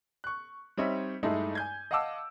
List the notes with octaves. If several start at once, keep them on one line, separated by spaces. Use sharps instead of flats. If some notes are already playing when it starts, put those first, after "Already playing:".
C#6 F#6
G3 C4 D#4 C#5 D#5 E5
G2 G#3 A3 D#4 E4
G#5 G6 G#6
D#5 F5 F#5 A5 D6 E6